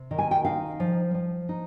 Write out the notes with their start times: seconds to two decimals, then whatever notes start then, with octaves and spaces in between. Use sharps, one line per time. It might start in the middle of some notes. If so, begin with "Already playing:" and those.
Already playing: C3
0.11 D#3
0.18 G#5
0.31 G5
0.45 D#4 F5
0.80 F3
1.14 F3
1.49 D#4